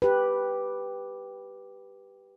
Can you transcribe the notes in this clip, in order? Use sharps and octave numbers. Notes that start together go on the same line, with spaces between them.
G4 B4